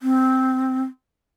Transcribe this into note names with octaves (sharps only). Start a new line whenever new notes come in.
C4